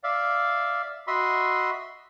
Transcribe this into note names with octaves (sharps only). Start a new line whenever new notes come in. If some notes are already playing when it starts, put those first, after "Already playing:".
D5 E5 F5
F#4 D#5 E5 B5 C6